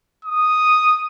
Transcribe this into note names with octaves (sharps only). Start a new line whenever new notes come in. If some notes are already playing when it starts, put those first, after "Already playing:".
D#6